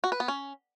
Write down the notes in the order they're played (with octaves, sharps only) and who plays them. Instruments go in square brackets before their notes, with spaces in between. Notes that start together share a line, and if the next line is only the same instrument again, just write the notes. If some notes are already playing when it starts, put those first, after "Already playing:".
[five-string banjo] F#4
B4
B3
C#4